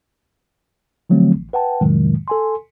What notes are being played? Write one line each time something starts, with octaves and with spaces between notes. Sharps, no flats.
D3 F3 F#3 A3 C4
A1
B4 F#5 G5 A5
F2 A2 C3 D#3 F#3 G#3
A4 G#5 C6